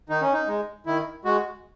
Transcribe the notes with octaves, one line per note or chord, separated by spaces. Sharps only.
D#3 D#4
C#4
D#4
G#3
D#3 E4
G#3 F#4